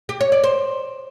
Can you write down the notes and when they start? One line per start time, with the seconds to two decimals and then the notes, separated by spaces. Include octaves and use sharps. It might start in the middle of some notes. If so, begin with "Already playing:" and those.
0.09 G4
0.21 C#5
0.32 D5
0.44 C5